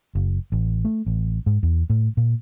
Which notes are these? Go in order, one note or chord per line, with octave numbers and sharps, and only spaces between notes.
F#1
A1
A3
A1
G#2
E2
A2
A#2